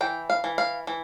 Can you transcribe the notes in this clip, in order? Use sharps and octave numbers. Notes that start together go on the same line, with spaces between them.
E3 G5
F5
E3
F5
E3